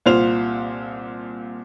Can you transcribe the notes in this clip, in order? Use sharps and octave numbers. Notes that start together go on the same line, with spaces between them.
C2 A#2 F4 C5 F7